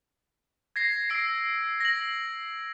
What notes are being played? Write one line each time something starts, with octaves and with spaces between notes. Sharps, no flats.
G#6 A#6 C7
E6 A#6 C7 D7
A#6 F#7